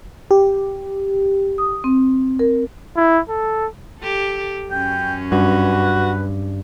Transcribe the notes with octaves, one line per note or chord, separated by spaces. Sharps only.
G4
D#6
C4
A#4
E4
A4
G4 A4
F#2 C#4 G5
G2 F#4 B4